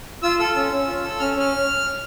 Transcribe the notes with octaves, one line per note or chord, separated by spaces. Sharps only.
F4 E6
A4 E6
C#4
C#4
F4
A4
C#4 F6
C#4 F6